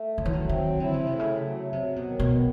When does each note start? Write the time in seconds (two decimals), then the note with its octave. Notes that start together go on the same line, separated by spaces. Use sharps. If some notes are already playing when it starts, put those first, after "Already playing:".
Already playing: A3
0.18 D#3 F#3
0.25 E3
0.33 D#3
0.49 D#3 C4
0.80 D3 E4
0.94 C#3
1.07 C3 A3
1.19 C#3
1.42 F#3
1.72 C3 F#3
1.96 B2
2.05 D#3
2.20 B2
2.34 B3